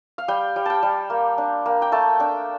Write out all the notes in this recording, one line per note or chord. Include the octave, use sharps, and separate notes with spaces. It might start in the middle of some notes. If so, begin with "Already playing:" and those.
F5
G3 G5
G3
G5 A5
G3
A#3
D4
A#3
G5
A3 A5
D4 G5